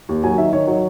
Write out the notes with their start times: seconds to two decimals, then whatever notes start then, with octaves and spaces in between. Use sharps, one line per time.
0.09 D#2
0.24 F#3 G#5
0.38 D#3 E5
0.53 D#3 C#5
0.67 F#3 C#5